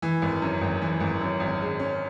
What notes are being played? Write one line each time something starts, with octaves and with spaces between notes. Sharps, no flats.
E3
G#1
F#2
G#1
E3
G#1
F#2
G#1
G#3
C#4